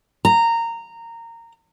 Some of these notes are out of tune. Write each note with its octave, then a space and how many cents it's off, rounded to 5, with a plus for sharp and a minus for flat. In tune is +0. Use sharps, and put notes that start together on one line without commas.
A#5 -15